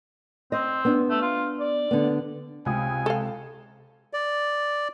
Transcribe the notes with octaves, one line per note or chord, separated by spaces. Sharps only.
C4 D#5
B3 D4
A3
F4
D5
D3 B3
C#2 C3 G5 G#5 D#6
A4 F5
D5